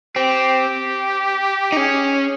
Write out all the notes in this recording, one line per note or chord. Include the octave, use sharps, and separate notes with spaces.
C4 G4
D#4
C#4 G#4